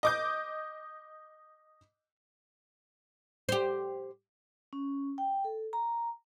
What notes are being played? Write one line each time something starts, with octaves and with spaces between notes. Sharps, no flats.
D#5 D6 G6
G4 C5
C#4
G5
A4
A#5